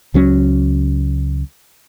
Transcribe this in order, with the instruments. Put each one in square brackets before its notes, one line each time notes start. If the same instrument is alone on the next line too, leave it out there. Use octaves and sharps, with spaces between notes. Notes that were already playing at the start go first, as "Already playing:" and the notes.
[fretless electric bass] C#2 F#3 C#4